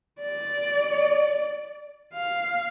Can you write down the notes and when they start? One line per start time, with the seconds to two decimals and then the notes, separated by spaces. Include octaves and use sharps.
0.21 D5
2.13 F5